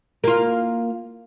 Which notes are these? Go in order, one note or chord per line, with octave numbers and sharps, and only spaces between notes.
A#3 F4